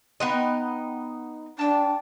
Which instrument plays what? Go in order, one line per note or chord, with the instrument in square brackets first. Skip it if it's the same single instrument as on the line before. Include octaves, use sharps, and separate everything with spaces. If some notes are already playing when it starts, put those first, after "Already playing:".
[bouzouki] B3 D#4 D#5 [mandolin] G5 C6 F#6
[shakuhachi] D4 [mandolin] G5 A5